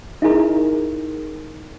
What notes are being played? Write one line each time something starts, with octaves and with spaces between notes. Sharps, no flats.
D#4 E4 G#4 A#4